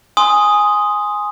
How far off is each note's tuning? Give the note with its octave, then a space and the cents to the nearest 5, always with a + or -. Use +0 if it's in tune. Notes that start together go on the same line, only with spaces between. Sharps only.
G#5 +0 C6 +0 D#6 +0